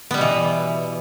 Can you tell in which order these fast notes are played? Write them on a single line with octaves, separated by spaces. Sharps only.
B3 G3 B2 E3